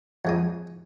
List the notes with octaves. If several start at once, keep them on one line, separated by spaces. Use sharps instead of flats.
F2 G#3 D#6